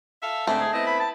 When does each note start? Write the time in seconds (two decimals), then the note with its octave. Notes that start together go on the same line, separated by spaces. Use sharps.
0.23 A4 E5 F5
0.47 G#2 D3 A3 C4
0.60 G#4
0.73 B3 C4 E4 D#5
0.86 B5
1.00 A5